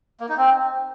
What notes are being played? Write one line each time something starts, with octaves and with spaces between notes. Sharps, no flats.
A#3
D#4
C4